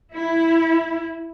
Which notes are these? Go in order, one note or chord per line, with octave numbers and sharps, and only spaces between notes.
E4